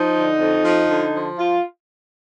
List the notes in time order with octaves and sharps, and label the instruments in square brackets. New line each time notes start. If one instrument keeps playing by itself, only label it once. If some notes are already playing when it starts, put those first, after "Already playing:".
Already playing: [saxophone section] F3 D#4
D3
F2
F3
D3
F3
F4